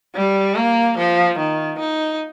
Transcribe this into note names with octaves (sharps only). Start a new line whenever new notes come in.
G3
A#3
F3
D#3
D#4